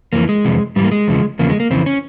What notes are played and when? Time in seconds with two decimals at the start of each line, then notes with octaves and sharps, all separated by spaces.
0.13 F2 E3 A#3
0.29 G#3
0.45 F2 C3 E3
0.76 G#2 E3 G3
0.84 A#3
0.92 G#3
1.08 E2 C#3 F3
1.39 E2 C#3 F3 A#3
1.50 G#3
1.60 A#3
1.70 F2 C#3 E3 C4
1.86 C#4